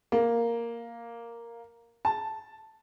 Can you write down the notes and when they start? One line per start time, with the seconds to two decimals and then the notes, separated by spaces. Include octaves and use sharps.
0.12 A#3
2.05 A5